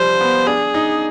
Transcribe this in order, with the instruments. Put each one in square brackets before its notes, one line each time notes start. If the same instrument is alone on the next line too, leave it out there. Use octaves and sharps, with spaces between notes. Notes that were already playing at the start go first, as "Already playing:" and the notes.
Already playing: [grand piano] F3 G3 [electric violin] C5
[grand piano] B3
[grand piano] D4 [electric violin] G#4
[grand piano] D#4